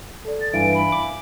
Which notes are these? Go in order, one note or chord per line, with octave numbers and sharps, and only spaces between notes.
A4 D5
A6
G2 E3 E5 F5 G#5 D7
B5
D6